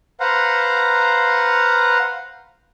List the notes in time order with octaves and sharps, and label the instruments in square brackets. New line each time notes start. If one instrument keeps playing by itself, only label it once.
[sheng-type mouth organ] B4 C5 F5 F#5 A#5